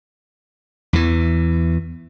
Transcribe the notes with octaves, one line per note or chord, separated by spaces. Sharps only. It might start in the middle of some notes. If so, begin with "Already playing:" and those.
E2 E3